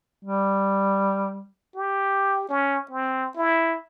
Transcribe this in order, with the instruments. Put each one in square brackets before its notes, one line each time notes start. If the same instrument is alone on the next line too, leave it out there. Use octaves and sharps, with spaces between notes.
[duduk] G3
[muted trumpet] G4
C#4
C4
E4